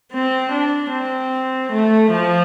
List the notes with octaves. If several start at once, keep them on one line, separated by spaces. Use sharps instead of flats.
C4
D4
C4
A3
F3